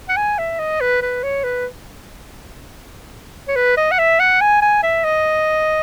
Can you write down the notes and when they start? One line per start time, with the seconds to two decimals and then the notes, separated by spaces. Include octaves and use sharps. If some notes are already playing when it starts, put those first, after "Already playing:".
0.09 F#5
0.17 G#5
0.38 E5
0.59 D#5
0.81 B4
1.02 B4
1.23 C#5
1.44 B4
3.48 C#5
3.56 B4
3.77 D#5
3.91 F#5
3.99 E5
4.20 F#5
4.41 G#5
4.62 G#5
4.83 E5
5.04 D#5